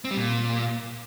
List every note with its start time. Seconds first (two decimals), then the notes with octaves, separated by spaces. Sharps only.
0.05 C4
0.11 G3
0.17 A#2